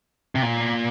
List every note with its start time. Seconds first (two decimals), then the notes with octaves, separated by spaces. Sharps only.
0.35 C3
0.42 A#2